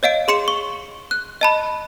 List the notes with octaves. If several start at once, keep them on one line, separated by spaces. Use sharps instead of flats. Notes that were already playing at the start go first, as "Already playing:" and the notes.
C#5 D#5 F5 D7
G#4 C6 C#7 E7
C#6
F#6
D#5 A5 B5